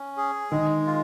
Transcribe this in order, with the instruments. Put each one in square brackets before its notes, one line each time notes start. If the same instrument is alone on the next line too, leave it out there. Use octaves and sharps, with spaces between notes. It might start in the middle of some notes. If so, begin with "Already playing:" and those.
Already playing: [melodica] C#4
G#4
[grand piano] D#3 [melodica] G#3
[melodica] F4